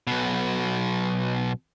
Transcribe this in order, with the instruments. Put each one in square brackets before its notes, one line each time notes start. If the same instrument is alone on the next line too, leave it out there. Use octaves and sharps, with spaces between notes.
[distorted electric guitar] B1 B2